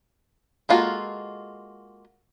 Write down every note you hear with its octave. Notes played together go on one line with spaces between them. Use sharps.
G#3 A#3 F4 F#4 A4